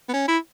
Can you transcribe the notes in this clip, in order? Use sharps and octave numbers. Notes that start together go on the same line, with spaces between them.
B3
C#4
E4